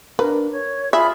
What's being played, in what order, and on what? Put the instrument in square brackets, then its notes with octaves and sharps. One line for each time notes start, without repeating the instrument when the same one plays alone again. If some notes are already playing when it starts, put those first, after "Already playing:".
[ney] D4 [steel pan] A#4 [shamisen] B4
[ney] C#5
[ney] F4 [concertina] G#4 B5 [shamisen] E5